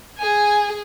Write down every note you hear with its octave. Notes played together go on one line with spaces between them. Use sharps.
G#4 G#5